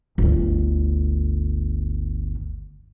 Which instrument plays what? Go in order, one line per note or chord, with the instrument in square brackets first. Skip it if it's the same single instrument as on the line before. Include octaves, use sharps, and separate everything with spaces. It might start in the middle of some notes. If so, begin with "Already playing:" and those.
[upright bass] G1 D2